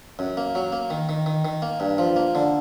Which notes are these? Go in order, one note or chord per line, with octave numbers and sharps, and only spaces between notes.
F#2
A#3
F#3
A#3
D#3
D#3
D#3
D#3
A#3
G2
F3
A#3
D3